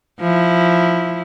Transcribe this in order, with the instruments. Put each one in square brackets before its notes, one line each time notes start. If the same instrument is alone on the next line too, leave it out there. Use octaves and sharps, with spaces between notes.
[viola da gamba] F3 E4